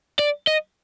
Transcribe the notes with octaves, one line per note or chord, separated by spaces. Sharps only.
D5
D#5